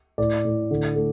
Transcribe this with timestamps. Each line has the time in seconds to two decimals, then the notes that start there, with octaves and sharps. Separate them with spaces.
0.18 A2 D5
0.45 A2
0.71 D3
0.96 A3